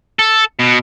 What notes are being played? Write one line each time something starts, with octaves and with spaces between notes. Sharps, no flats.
A4
B2